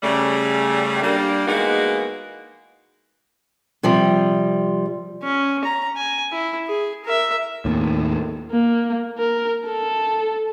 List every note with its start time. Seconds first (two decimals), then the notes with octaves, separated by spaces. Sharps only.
0.03 C#3 G3 A3
1.02 G3 A#3 D4
1.47 E3 G#3 A#3 B3 D#4 F#4
3.83 C3 F3 G3
5.23 C#4
5.64 A#5
5.96 G#5
6.32 E4
6.68 G#4
7.05 A#4 E5
7.65 D#2 A2
8.51 A#3
9.18 A#4
9.66 A4